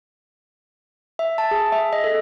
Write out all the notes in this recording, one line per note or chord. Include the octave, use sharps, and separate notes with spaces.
E5
A5
G#4
E5
D#5
A4